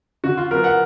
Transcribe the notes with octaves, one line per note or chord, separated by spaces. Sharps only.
D3 F#4
F4
F#3 B3 A#4
F#5